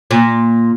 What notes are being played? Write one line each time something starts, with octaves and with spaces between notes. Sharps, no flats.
A#2